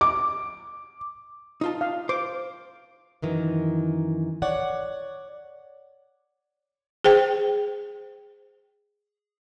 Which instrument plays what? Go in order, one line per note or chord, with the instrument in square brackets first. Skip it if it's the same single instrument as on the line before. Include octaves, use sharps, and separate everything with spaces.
[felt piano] D6
[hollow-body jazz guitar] D#4 F4 A5
[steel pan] F5
[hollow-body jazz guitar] C5 [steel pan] D6
[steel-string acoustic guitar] F#2 D#3 E3
C#5 D5 F#5
[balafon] G#4 C5 G5